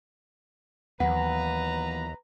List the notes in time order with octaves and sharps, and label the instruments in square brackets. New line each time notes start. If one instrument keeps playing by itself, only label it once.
[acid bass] D#2 [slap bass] E3 F#3 B3 [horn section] B4 A#5 [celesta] F#5